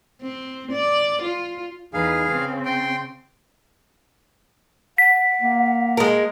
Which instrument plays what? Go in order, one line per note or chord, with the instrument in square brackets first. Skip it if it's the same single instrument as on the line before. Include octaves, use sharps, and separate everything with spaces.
[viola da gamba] C4
D5
F4
[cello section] E2 D#4 B4 [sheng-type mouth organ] G#4 F5
[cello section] C#3 C4
[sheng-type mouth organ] G5 C6
[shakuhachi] F#5 [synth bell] B6
[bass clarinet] A#3
[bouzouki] G#3 A#4